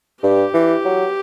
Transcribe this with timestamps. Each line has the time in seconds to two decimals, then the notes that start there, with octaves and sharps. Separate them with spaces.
0.23 G2 G4
0.54 E3
0.85 F#3